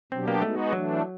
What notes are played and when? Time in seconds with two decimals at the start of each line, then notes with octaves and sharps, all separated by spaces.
0.12 B2 F#3 B3 C4 D4 G4
0.28 A#3
0.42 G#3 A3 B3 D#4 F#4
0.72 E3 F#3 A3 D4